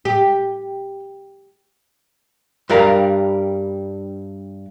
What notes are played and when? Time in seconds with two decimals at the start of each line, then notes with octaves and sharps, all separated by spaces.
0.05 G4
2.70 G2 G3 A#4 F5 A#5